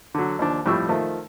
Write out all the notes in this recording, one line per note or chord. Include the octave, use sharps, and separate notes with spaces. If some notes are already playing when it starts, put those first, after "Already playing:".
D3 F#3
D#2 F3 D4
F2 A2 G3 C#6 E6
D#3 F3 A3